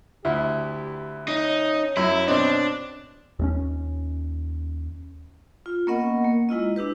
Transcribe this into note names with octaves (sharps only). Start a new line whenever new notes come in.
D2 E4 G4
C#4 D#4
F#2 E4 E5
B2 C4 D4 D#5
D#2 A3 C#4
F4
A#3 B3 C#4 A#4 D#5 F#5
A#3
G#3 E4 F4 D#5
D4 E4 G4 B4